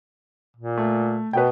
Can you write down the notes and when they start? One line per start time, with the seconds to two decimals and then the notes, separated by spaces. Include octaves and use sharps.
0.57 A#2
0.77 A3
1.33 B2 B4 F#5 G5